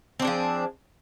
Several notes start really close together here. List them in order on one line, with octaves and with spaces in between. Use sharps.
C4 D4 G#4 F3